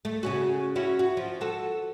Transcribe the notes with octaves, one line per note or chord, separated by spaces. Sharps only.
A3
C#3 C#4 F#4
C#4 E4 F#4
F#4
F3
F#4 A4